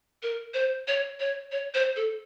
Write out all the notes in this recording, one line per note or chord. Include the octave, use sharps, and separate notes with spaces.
A#4
C5
C#5
C#5
C#5
C5
A4